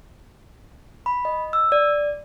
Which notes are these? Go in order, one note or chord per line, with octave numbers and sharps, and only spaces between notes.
B5
D#5
E6
D5